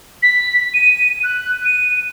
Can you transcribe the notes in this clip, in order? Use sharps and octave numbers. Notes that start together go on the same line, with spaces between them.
B6
D#7
F#6
D#7